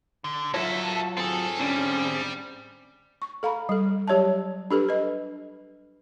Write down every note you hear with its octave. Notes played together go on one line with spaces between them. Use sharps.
D3
F#3 F4 A4 A#4 C#5 E5
C4 G#4 A4
D3 G3 C#4
C#6
A4 F5 A#5 B5
G3 A4
F#3 G4 C#5 E5 A5
D4 G4 A4 B4
B4 D#5